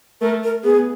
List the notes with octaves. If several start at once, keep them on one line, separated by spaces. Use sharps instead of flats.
A3 A#4
A#4
B3 G#4